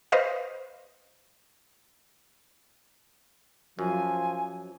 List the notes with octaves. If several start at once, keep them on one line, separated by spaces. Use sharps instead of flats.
B4 C5 D#5 F5
F#2 F3 G#5